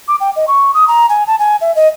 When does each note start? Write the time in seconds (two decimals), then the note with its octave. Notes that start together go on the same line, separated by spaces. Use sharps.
0.08 D6
0.20 G5
0.36 D#5
0.48 C#6
0.74 D#6
0.88 A#5
1.09 G#5
1.27 A5
1.39 G#5
1.61 E5
1.76 D#5